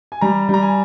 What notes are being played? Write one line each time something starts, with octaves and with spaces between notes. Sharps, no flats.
G#5
G3 A#5
G3 A#5
G#5